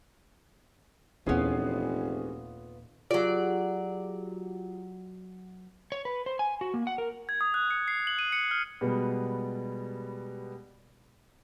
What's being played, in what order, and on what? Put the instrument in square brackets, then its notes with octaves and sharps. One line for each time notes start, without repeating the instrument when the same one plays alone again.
[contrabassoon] F1 [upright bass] D#2 A#2 [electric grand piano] E3 C#4 G#4 [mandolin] B3 F4
[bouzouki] F#3 D5 [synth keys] F4 G4 G#4
[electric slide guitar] C#5
B4
C5
G#5
F#4
A#3
F#5
A#4
[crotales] G#6
D#6
F#6
C#7
C7
F#7
D#7
C#7
F6
[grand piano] B2 G3 G#3 B3